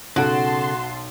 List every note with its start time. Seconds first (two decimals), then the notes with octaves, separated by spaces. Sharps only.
0.16 B1 C#3 F#4 A4 A5 C6 D7